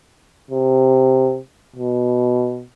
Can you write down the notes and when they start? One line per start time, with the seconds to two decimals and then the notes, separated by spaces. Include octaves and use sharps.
0.51 C3
1.76 B2